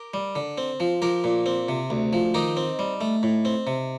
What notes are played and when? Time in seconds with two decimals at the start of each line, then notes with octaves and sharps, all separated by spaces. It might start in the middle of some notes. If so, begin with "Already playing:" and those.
Already playing: G4 A#4
0.14 G3
0.36 D3
0.58 C4
0.80 F3
1.02 F3 G4 A#4
1.24 A#2
1.46 C4
1.68 C3
1.90 D2
2.13 F3
2.34 D#3 D#4 G4
2.57 C4
2.79 G3
3.01 A3
3.23 A2
3.45 C4
3.67 C3